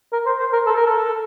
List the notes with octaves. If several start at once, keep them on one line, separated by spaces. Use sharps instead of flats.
A#4
C5
C5
A#4
A4
A#4
A4